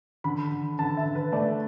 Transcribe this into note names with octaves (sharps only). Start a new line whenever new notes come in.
D3 B5
D3
D3 A5
E5
D3
B4
A3 D5